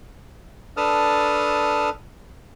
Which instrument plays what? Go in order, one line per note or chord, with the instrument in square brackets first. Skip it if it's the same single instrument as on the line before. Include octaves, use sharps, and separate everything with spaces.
[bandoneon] D4 A4 B4 A5 D#6 F6